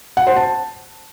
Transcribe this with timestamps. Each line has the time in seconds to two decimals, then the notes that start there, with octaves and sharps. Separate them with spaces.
0.17 F#5
0.27 C5
0.36 A5